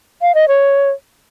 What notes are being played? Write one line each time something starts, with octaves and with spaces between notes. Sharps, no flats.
F5
D#5
C#5